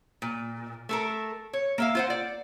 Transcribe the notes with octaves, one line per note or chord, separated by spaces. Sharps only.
A#2
A3 A4 A#4
C#5
A#3 E5 F5
F4 C5 F#5
D5